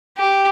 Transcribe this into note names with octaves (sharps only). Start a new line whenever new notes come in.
G4